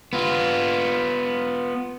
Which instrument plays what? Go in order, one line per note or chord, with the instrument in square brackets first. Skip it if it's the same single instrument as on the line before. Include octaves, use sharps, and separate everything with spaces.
[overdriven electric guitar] B3 F4